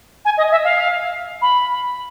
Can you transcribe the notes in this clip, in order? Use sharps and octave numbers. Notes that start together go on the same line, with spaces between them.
G#5
D#5
E5
F5
B5